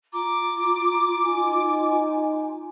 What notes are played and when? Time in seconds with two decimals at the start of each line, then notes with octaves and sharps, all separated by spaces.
0.13 F4 A#5 D6
1.24 D#4 G#5